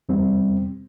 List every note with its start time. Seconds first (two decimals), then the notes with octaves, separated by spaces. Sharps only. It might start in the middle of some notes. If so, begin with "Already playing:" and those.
0.09 E2 G3 C4